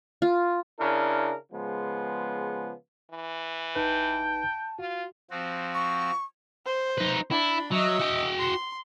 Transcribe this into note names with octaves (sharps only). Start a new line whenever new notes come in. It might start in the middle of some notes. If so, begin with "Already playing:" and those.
F4
C#3 D4 E4 A#4
C#3 F3 G#3 B3
E3
G#1 D#4 B4 G5 A5
F4 F#4
F3 C4 F#4
C#6
C5
D#4 B4
D4 E4 B5
F#3 D#5 E5
F#4 G5
C6